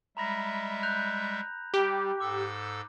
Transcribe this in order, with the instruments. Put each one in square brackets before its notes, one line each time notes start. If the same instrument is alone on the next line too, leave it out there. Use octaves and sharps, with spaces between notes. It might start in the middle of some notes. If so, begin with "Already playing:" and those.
[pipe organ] G3 G#3 E5 [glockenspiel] A#5 B5 A#6
[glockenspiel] F#6 G6 F7
[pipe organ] G3 [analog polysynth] G4
[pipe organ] G#2 A4 E6 [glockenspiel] D6